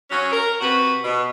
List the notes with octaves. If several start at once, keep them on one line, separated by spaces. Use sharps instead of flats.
F#3 C#4
A#4
C3 F#4 B4
B2